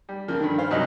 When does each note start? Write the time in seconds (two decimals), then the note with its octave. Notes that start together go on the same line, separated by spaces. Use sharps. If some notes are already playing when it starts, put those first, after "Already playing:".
0.09 G3
0.28 C#3 F3 A#3
0.40 G2 D3 D#3
0.59 C5 F5
0.71 C2 F#3 D#4 D#5